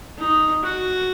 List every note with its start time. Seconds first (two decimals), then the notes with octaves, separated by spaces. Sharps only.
0.18 D#4
0.63 F#4